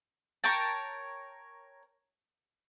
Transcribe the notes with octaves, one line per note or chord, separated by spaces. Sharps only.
A#4 C#5 G5 A5